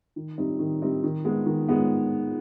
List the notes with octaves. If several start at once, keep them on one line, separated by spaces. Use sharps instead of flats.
D#3
G3 C4 D#4
D#3
G3 C4 D#4
D#3
G#3 B3
D#3
G#3 B3